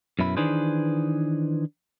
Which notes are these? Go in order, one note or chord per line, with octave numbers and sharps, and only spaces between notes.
F#2 B2 E4 B5
D#3 E3 D4 G#4 B4 C5